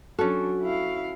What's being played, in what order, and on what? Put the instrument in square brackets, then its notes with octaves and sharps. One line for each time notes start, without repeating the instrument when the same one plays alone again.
[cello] F#3 D4 [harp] C#4 F#4 [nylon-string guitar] A4
[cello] E4 F5